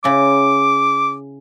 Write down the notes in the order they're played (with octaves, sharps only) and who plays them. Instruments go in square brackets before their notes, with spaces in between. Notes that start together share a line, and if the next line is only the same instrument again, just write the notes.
[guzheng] C#3 E4 [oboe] D6